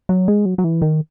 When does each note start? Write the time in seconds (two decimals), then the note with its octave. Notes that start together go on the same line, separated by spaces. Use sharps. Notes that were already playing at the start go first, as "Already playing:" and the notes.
0.09 F#3
0.28 G#3
0.45 F#3
0.58 F#3
0.64 E3
0.82 D#3